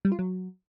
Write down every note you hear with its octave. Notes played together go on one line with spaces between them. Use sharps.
G3
F4
F#3